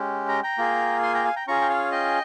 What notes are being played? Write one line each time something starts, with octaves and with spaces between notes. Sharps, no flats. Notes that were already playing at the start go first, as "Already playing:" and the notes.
Already playing: G#3 C#4 G4
G5 A#5
G5 A#5
A#3 F4 G#4
G#5 C6
G5 A#5
F5 G#5
G5 A#5
C#4 F4 G#4 A#5 C#6
G5
C#5 F5
D#5 G5